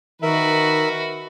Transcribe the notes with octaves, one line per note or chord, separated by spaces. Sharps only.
D#3 F#4 A#4 B4 E5